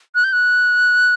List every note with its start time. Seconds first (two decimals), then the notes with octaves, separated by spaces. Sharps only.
0.15 F#6
0.24 G6
0.33 F#6